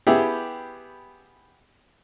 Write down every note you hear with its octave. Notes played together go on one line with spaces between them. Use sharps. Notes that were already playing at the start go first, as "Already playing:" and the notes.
B3 E4 G4 G#4